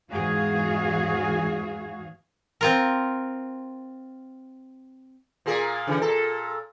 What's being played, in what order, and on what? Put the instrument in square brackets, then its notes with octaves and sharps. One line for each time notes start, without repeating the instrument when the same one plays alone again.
[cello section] E2 G#2 E3 F#4 G#4 F5
[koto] C4 F4 A#4
[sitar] A#2 A#3 G#4
C#3 E3
A#2 A4